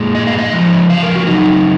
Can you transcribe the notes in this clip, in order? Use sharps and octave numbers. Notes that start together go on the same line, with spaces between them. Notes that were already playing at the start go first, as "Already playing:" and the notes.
Already playing: A#2 G#3
D#5
F5
D#5
C#3 F3 G#3
F5
A#4
F#4
C#3 F#3 D#4